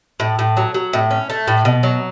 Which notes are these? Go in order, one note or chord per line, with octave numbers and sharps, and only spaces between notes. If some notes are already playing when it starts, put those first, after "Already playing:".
A2
A2
F#3
F#3
A2
C#4
A3
A2
B2
F#3